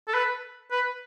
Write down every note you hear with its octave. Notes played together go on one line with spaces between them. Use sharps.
A4
B4
B4